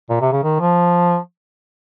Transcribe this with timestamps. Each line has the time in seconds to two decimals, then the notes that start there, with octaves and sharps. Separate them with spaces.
0.09 A#2
0.21 C3
0.32 C#3
0.43 D#3
0.60 F3